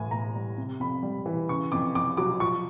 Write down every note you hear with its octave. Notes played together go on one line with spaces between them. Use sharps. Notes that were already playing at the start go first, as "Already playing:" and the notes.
Already playing: A2 E3 G#5
A2 A#5
G3
C3
F2 B5
G3
E3
C#3 C#6
F2 D6
F2 D6
F#3 D6
F3 C#6